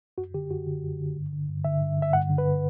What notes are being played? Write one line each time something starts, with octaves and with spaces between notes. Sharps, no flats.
F#2 F#4
D3 G4
F#2 F#4
D3
F#2
D3
G2
D3
G2
D3 E5
G2
D3 E5
G2 F#5
D3
B4